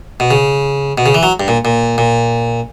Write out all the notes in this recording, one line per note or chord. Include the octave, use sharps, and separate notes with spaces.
B2
C#3
B2
C#3
E3
F#3
G2
A#2
A#2
A#2